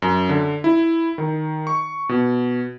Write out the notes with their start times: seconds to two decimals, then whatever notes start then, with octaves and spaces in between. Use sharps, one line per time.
0.02 F#2
0.29 D3
0.64 E4
1.18 D#3
1.67 C#6
2.09 B2